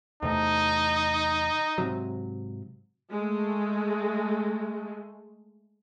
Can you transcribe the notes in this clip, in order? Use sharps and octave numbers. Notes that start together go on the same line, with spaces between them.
E2 C3 A3 D#4
G#2 C3 F#3
G#3 A3